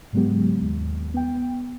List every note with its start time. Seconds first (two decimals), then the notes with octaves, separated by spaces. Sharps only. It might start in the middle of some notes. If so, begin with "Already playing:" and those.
0.13 G#2 C#3 F#3 G#3 B3 G4
0.62 D#2
1.14 B3 G5